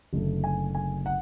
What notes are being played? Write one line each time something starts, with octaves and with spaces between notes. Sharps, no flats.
F#1 F#2 D3 A3
G#5
G#5
F#5